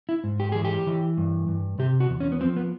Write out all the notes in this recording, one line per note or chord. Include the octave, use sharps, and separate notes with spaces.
E4
G#2
G4
E3 G#4
G4
E3
G2
G2
C3 G4
F#4
E2
C#4
B3
F3 C4
B3